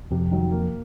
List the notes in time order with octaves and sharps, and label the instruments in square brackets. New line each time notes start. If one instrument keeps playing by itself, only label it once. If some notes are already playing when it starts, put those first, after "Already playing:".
[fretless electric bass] F2 [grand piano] C3
[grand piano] D#3 F#3
A#3